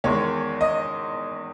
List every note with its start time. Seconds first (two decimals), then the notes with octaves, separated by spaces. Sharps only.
0.04 E2 D#3 G#3 C#5
0.61 D#5